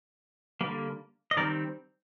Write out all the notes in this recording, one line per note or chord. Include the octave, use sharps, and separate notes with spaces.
D3 G3 A#3
D#5
D#3 G3 C4 A#4 D5